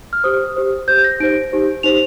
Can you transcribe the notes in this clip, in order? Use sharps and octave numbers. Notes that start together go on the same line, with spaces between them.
F6
G4 C5 D#6
G4 C5
G4 C5 G6
A#6
D#4 G4 C5 D7
D#4 G4 C5
D#4 G4 C5 F7